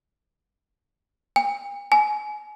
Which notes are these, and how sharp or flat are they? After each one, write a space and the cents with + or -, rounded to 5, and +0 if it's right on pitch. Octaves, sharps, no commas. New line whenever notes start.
G#5 -45
G#5 +25